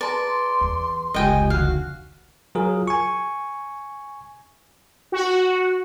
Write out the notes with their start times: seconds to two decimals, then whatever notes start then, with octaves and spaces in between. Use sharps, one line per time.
0.01 G#4 B4 D5 A5 A#5 C6
0.61 E2
1.14 F1 C#2 G#3 F4 G4 D#5 G5 G#5
1.50 F2 D3 D#3 F#4 F5
2.55 F#3 F4 G#4 A#4
2.88 G#5 C#6
5.12 F#4